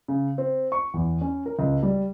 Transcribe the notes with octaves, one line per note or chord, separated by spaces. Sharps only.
C#3
C4
C#6
E2
C#4
A#4
C#2
G3